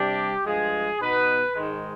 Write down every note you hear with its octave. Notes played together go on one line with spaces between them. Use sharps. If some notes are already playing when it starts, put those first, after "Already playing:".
Already playing: C3 G3 D4 G4
G2 F3 G#3 G#4
B2 B3 D#4 B4
G#2 D#3 G#3